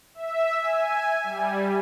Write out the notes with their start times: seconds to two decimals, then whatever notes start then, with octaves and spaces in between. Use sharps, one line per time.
0.15 E5
0.60 G#5
1.24 G3